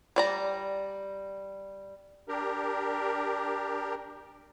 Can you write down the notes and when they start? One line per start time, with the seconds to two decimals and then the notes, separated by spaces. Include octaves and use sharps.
0.16 G3 D5 A#5
2.28 D4 G4 A#4